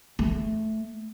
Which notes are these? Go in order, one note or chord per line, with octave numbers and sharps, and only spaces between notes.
A3